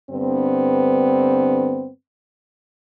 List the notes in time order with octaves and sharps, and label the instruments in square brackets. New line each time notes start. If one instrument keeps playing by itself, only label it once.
[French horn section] G2 D3 B3 C4